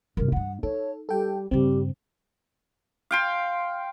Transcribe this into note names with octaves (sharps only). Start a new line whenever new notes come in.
G2 C3 A#4
G2 E4 F#5
D#4 A4 C#5
G3 A4 G5
G2 C#3 G3 C4
F5 G5 C6